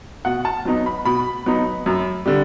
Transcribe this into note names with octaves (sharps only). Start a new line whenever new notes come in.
B2 F#5
A5
F#3 B3 D#4
B5
B2 B5
F#3 B3 D#4
F#2
D3 G3